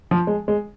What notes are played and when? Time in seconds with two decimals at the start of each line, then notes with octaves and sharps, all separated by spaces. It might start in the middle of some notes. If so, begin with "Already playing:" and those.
0.11 F3
0.27 G#3
0.48 G#3